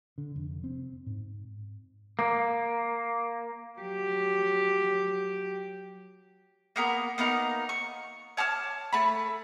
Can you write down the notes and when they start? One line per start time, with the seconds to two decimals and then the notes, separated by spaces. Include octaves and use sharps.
0.18 D3
0.36 F1
0.64 C4
1.06 G#2
2.19 A#3
3.79 F#3 G4
6.76 A#3 B3 A#4
7.18 A#3 B3 D#4 A#4
7.69 C#6
8.37 C#5 A5 D6 F6
8.93 A3 A5 B5